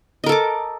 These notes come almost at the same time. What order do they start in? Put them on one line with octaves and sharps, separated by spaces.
D#5 A#4 A4 D6